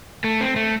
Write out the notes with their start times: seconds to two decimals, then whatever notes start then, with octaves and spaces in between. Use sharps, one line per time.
0.24 A3
0.41 C4
0.56 A3